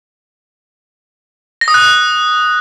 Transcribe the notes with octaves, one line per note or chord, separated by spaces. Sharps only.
A#6
D#6
F#6